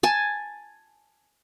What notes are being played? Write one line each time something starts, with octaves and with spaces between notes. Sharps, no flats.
G#5 A5